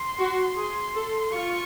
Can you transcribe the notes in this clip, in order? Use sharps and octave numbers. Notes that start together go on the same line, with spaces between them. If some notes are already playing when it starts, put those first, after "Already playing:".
Already playing: C6
F#4
G#4
A4
F4 C#6